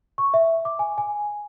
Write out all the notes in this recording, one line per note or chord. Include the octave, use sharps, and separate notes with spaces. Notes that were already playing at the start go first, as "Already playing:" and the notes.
C#6
E5
D6
G#5
G#5